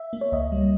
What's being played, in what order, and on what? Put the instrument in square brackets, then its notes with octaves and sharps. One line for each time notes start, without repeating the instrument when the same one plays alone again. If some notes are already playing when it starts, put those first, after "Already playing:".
Already playing: [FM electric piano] E5
A#3
C#5
C#2 D#5
G3